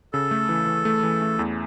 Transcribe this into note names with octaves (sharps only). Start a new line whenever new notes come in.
C#3 A4
A3
E3
E3
A3
E3
A3
E2